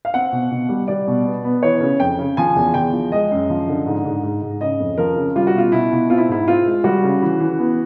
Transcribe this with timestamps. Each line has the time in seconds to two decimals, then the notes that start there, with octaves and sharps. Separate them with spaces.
0.05 F5
0.14 C4 F#5
0.32 B2
0.51 B2
0.69 G3
0.88 G3 D5
1.08 B2
1.26 B3
1.44 B3
1.63 E3 C#5
1.81 C#3
2.00 F2 G5
2.19 C#3
2.37 F3 G#5
2.56 E2
2.74 E2 G5
2.93 F3
3.12 G#3 D#5
3.31 F#2
3.50 F3
3.68 D3
3.86 G#2
4.05 G#2
4.23 G#2
4.42 G#2
4.61 C#3 D#5
4.80 F2
4.98 F3 A#4
5.16 C#3
5.36 G3 F4
5.47 F#4
5.54 B2 F4
5.72 B2 E4
5.92 B2
6.10 C4 F4
6.18 E4
6.29 G#2 E4
6.48 C4 F4
6.66 G#3
6.84 G3 F#4
7.03 C#3
7.22 E3
7.40 E3
7.58 B3